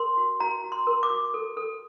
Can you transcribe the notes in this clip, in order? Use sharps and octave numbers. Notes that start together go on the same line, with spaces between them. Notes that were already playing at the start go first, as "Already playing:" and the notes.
Already playing: A#4 C6
F#4
F#4 A#5
F#4
C6
A#4
D6
F#4
A4
A4